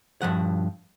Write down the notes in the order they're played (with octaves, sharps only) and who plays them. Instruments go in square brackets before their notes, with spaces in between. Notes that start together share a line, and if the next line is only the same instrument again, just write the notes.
[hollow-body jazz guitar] G2 F3 F#5